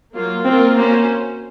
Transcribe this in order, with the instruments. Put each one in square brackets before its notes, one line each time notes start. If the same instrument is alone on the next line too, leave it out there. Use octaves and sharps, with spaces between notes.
[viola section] F#3 A#3 F4
[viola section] A#3 F4 A#4 [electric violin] C4
[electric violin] A#3 [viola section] C#4 F#4 C5